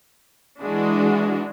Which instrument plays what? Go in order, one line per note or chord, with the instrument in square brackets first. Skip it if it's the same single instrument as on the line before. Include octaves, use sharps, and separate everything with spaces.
[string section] E3 G#3 D4 E4 F#4